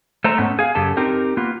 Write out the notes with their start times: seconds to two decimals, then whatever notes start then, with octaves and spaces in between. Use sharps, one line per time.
0.24 A3 C5 A#5
0.38 G#2 A3 B3 C#4
0.59 G#4 F5
0.75 F#2 C#3 G4 A4 A5
0.97 C4 D#4 G4 A#4
1.37 A#3 B3 F4